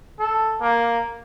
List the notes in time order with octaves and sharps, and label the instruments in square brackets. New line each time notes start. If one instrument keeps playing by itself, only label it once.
[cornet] A4
A#3